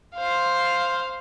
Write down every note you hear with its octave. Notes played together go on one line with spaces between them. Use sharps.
C5 F5